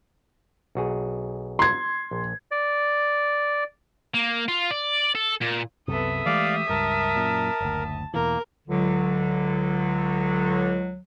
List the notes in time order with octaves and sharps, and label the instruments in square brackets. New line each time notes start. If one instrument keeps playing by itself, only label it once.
[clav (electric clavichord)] B1 F#4 G#4
[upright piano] C6 G#6
[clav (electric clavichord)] A#1
[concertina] D5
[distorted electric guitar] A#3
F4
D5
A4
A#2
[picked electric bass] C2 F#2 C3 [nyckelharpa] B3 A4 [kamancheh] E5 D#6
[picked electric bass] E3 G#3 A3 [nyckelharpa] G4 [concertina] D5 F5
[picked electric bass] C#2 G2 [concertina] A#4 [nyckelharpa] A5
[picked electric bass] F#2 A#2
F#1 D2
[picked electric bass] E2 B2 E3 [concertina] A#3 [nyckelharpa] A#4
[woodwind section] C#2 D3 F#3